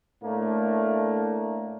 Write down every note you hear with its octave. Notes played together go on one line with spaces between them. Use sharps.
A2 A3 A#3 D4